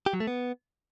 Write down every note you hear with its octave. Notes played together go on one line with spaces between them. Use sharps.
G4
F#3
A3
B3